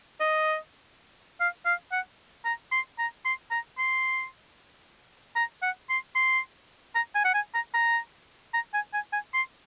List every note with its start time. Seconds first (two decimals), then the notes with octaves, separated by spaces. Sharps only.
0.20 D#5
1.40 F5
1.66 F5
1.92 F#5
2.45 A#5
2.72 C6
2.99 A#5
3.25 C6
3.51 A#5
3.78 C6
5.36 A#5
5.62 F#5
5.90 C6
6.15 C6
6.95 A#5
7.15 G#5
7.24 F#5
7.34 G#5
7.54 A#5
7.74 A#5
8.54 A#5
8.74 G#5
8.93 G#5
9.13 G#5
9.34 C6